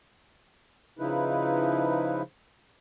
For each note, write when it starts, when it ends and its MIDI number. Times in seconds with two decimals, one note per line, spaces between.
0.99 2.22 49
0.99 2.22 53
0.99 2.22 63
0.99 2.22 64
0.99 2.22 71